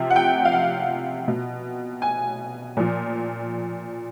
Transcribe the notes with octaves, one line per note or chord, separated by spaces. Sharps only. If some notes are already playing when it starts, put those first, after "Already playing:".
Already playing: C3 F3
F#5
G5
F5
F#5
B2
G#5
A#2 F3